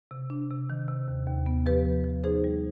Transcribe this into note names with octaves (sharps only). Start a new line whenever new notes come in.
C3
D4
C3
D#3
C3
D#2
D#2
B3
F3 G4 B4
F3
F3
D#4 G#4 C5
G3